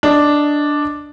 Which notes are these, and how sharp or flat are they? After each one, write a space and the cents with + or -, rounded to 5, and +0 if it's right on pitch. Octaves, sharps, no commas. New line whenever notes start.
D4 +0 D#5 +0